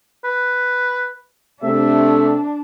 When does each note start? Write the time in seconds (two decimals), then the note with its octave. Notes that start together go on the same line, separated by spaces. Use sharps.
0.24 B4
1.63 C3 A3 D4 E5